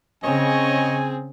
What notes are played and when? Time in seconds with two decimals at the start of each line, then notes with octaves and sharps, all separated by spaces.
0.24 C#3 C4 G#4 C#5 D#5 G#5